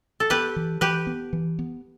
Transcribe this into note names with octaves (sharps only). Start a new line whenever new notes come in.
A4
B3 G4 B4
E3
E3 G4 B4
B3
E3
B3